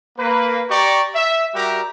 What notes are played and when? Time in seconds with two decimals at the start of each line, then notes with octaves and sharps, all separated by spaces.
0.18 A#3 B4
0.70 G4 D5 A#5 C#6
1.15 E5
1.54 G3 F#4 G4 A#4 E5 A#5